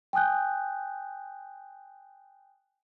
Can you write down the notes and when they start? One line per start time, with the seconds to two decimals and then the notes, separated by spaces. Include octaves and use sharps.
0.13 G5 G#5 D#6 F#6 G6